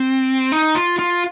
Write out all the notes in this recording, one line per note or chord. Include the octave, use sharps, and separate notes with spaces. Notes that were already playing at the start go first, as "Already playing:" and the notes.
Already playing: C4
D#4
F4
F4